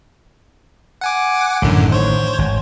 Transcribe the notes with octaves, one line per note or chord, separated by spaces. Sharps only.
F#5 G#5 D6
A1 F#2 A2 D3 D#3
C5 C#5
G#1